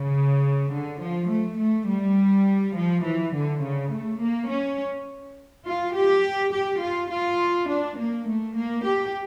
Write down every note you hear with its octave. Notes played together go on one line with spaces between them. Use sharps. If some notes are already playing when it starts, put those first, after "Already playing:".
Already playing: C#3
D3
F3
A3
A3
G3
F3
E3
D3
C#3
A3
A#3
C#4
F4
G4
G4
F4
F4
D4
A#3
A3
A#3
G4